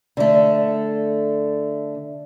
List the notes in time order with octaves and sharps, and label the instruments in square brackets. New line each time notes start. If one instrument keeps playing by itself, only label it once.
[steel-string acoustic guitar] D3 A3